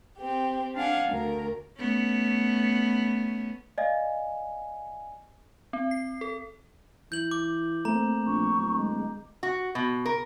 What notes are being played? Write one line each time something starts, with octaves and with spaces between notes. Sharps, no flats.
C4 G4
D4 F5 F#5 G#5
D2 A#4
A3 B3 C#4
D5 D#5 F5 G#5
C4
C7
A4
E3 G6 F#7
D6
A3 A#3 C4 A#5
A#1 C#6
D1
G#3
F#4
B2
A#4